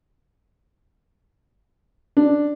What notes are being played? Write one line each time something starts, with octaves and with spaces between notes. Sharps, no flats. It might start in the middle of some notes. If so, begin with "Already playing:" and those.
D4